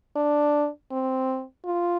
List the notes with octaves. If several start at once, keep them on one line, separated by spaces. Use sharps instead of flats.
D4
C4
F4